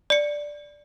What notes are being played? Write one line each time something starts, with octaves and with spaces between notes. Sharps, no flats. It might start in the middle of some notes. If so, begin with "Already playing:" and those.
D5 C#7